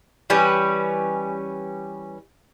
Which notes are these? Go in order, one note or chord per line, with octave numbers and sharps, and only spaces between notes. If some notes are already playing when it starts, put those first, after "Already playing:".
E3 G3 C#4 B4